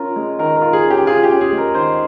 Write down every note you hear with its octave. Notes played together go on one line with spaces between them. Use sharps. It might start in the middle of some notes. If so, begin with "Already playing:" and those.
Already playing: C#4 F4 A#4
G#3
D#3 A#4
A#4
F4
G#4
C#4
G4
F4 G#4
G4
C#4
G#4
G#3
A#4
D#3 C5